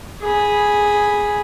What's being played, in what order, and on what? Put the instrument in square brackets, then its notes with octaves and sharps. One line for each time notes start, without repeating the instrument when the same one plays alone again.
[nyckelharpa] G#4 B5